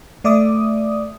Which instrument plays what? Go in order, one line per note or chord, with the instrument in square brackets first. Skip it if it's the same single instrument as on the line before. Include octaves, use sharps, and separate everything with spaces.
[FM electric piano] A3 D5 E5 D6 D#6